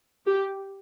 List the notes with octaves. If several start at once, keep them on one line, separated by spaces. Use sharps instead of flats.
G4